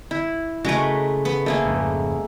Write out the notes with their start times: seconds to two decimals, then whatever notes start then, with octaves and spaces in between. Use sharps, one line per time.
0.11 E4
0.65 C#3 G#3 A3 F#4 A#4 B4
1.25 B3
1.46 A3 A#3 G#4
1.66 F2 G#2 C#3